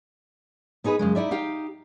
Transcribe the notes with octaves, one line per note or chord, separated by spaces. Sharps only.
B3 D#4 G#4 A#4 B4
F#2 C#3 G#3
D#4 E4 D5 E5
D#4 G4 F5